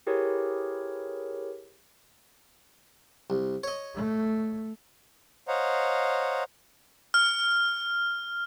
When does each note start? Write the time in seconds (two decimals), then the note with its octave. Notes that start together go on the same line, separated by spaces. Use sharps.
0.07 E4 G4 G#4 A#4 B4 C#5
3.30 C2
3.63 C#5 D#5
3.95 A3
5.48 C5 C#5 D#5 F5 F#5 A#5
7.14 F6